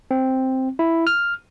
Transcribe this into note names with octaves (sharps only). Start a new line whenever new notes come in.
C4
E4
F6